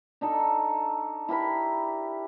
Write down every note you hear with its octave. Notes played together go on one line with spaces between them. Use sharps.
D4 D#4 A4
E4 G4 A#4 B5